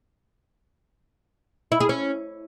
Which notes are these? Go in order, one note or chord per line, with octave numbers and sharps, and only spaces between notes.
E4
G#4
C#4